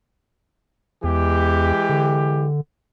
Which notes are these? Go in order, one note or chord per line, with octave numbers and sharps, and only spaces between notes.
E2 E3 G#3 G4
D3